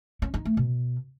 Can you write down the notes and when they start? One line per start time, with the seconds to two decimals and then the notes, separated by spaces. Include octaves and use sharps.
0.22 C#4
0.34 D#4
0.45 A3
0.57 B2